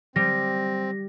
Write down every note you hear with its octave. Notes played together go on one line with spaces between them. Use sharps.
G3 C4 A#6